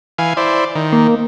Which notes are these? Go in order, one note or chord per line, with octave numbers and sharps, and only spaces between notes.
E3 F5 G#5
E4 C5 D5
D#3
A#3